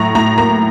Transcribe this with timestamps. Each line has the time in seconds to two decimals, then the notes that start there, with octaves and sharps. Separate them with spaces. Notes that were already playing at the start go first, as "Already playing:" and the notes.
Already playing: A2 F#3 A#5 C#6
0.15 A2 A#5
0.37 A#3 A#5